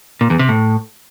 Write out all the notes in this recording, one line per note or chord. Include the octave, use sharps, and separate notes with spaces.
A#2
E2
C3
A2